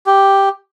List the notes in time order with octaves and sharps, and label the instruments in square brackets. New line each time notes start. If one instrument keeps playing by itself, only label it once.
[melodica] G4